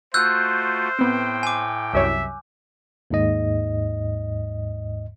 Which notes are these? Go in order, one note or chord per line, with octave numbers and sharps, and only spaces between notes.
A3 F4 F#4 C5 E6 F#6 G6
A2 B3 C4 G5
G#5 D6
C2 F#2 C#5 E5
D#2 G#2 D#5